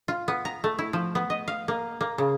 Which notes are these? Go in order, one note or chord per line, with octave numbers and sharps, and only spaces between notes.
F4
B3
A#5
A3
E4
F3
B3
D#5
F5
A#3
A#3
C#3